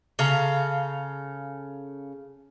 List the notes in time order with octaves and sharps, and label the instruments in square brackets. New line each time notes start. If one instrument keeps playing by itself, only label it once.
[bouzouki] C#3 A4 F5 A#5